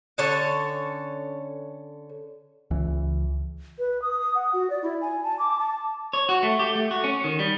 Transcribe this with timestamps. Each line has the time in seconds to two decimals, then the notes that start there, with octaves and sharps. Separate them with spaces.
0.18 D3 C#4 A4 C#5
2.71 C#2 E3
3.79 B4
4.02 D#6
4.35 F#5
4.53 F#4
4.70 D5
4.83 E4
5.01 G#5
5.24 A5
5.39 D6
5.59 A5
6.13 C#5
6.29 F#4
6.43 A3
6.59 G4
6.75 A3
6.91 F#4
7.04 C#4
7.24 D#3
7.39 G3